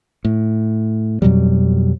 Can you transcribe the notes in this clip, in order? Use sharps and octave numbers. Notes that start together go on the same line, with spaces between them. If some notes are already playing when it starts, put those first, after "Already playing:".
A2
F2 B2 F#3 G3